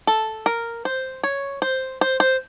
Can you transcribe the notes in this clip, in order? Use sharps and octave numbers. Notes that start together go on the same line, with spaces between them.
A4
A#4
C5
C#5
C5
C5
C5